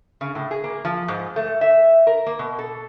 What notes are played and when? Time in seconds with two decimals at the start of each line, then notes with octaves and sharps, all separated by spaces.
0.21 C#3
0.35 A2
0.51 G#4
0.64 A#3
0.85 F3
1.08 G#2
1.36 A3
1.61 E5
2.07 A#4
2.26 A#3
2.39 B2
2.58 A4